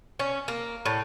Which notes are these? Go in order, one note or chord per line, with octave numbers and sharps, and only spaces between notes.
C#4
A#3
A2